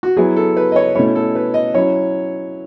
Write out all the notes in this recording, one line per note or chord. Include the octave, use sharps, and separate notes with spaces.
F#4
F#3 B3 E4 G#4
A4
B4
D#5
C#5
B2 A3 C#4 E4 C#5
A4
B4
D#5
F#3 C#4 E4 C#5